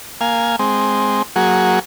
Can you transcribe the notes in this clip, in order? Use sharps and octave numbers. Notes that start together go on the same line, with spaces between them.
A#3 F5 G#5
G#3 C4
F#3 A#3 F#4 G#4